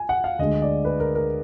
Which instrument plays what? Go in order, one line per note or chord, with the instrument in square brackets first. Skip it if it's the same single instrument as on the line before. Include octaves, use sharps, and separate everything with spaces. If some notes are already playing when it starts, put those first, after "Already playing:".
Already playing: [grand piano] G#5
F#5
F5
D2 D3 G#3 D#5
D5
B4
A#4
A#4